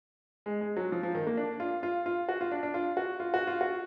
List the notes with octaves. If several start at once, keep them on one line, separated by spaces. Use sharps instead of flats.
G#3
G#3
F#3
F3
F3
D#3
A#3
D4
F4
F4
F4
F#4
F4
D4
D4
F4
F#4
F4
F#4
F4
F#4